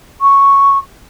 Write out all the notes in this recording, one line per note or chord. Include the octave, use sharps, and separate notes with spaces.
C#6